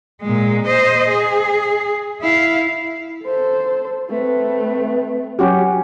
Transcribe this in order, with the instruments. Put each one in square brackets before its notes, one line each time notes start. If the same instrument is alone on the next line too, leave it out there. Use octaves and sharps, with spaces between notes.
[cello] A#2 G#3
C5 D#5
G#4
E4 F5
[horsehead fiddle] A4 C5
[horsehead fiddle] A3 C4 [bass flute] B4
[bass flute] F#3 [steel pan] C#4 F#4 G4